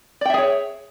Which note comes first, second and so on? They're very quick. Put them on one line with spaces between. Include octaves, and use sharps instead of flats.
D5 G5 E5 G#4 C#5